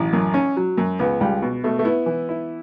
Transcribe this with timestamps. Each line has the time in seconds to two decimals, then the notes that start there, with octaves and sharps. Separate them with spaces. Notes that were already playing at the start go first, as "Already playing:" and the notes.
Already playing: A1 F#3
0.13 F#2
0.34 C#4
0.56 F#3
0.77 F#2
0.99 C#2 B3
1.20 C#2 G3
1.42 B2
1.64 B2 A3
1.79 A3
1.85 B3 E4
2.06 E3
2.29 E4